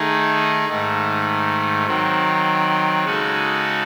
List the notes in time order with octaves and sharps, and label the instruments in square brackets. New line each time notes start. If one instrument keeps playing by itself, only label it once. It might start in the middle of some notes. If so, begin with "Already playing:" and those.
Already playing: [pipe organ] D#3 A3 D#4 G#4
G#2 D#3 A3
D#3 F#3 C4
C#3 G#3 D#4 F#4 A4